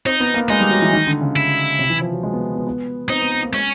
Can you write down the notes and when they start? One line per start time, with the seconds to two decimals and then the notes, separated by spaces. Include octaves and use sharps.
0.06 C4 D#4
0.20 B3
0.34 A#3
0.50 G#3 D#4
0.60 G3
0.71 F#3
0.82 E3
0.93 D#3
1.07 D3
1.21 C#3
1.36 E4
1.79 C3
1.90 E3
2.01 F3
2.13 F#3
2.23 G#3
2.33 B3
2.55 B3
2.67 B3
3.09 C4 D#4
3.20 B3
3.31 B3
3.43 A#3
3.54 G#3 C#4